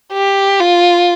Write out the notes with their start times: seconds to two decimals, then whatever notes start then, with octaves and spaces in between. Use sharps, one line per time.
0.13 G4
0.60 F4